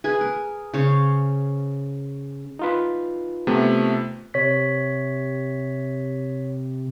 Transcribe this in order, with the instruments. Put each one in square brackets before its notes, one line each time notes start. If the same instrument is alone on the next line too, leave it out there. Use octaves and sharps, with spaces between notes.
[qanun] G#4 B4 G#5
A#4
C#3 C5 C#5 F5
[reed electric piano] D#4 F4 B4
[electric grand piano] C3 A3 B3
[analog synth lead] C3 [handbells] C#5 B6